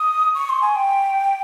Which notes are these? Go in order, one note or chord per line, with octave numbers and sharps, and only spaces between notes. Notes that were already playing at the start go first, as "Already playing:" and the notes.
Already playing: D#6
C#6
C6
G#5
G5